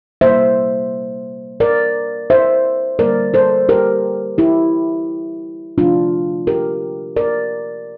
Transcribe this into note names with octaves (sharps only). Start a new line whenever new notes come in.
C3 G3 A#3 C5 E5
A#4 D5
C5 E5
D3 G3 A#3 A#4 D5
A4 C5
G4 A#4
E4 G4
C3 F3 A3 D4 F4
G4 A#4
A#4 D5